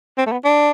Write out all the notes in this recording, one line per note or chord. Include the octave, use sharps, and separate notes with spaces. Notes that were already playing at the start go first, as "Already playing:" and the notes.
C4
A3
B3
D4